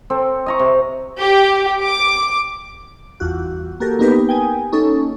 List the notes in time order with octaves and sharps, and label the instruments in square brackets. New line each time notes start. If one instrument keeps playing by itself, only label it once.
[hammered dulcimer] C4 A4
D#5 A#5 C#6
C3
[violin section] G4
D6
[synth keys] G1 E2 F4 F#4
A#3 F#4 G4 A4 A#4
A#3 B3 D#4 G4 A#4 B4
G5 G#5 D#6
A#3 C#4 D#4 A4